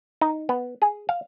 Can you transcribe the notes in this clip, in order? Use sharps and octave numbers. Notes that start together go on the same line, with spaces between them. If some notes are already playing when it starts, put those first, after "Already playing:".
D#4
B3
G#4
F5